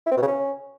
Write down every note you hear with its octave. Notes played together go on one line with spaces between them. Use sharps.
E4
C4
B2
C#3
C#4